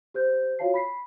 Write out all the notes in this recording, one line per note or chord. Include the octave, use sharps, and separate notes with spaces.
G4 C5 G6
F4 F#4 C#5 F5 A5 C7
B5 B6 C7